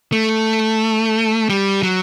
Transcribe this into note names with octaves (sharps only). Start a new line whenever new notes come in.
A3
G3
F#3